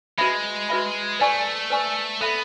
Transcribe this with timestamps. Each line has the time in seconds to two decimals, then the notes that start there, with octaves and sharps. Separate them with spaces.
0.18 G#3 F#4 B4 E5 B5
0.69 F#4 B4 E5 B5
1.20 A3 B4 D5 G#5 C#6
1.70 B4 D5 G#5 C#6
2.21 B3 A4 E5 B5